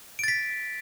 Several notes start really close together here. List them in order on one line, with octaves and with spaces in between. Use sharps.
D7 A6 B6